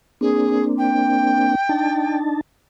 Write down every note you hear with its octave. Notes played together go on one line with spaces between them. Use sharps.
A#3 C4 D4 G#4
G5
D4 D#4 A5